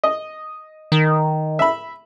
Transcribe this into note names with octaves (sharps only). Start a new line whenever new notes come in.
D#5
D#3
E5 B5